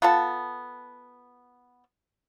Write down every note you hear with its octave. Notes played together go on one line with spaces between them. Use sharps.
B3 F4 A4 A5